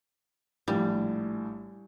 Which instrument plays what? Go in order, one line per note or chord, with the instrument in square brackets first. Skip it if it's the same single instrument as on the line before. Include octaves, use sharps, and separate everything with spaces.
[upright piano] A#1 A2 [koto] G3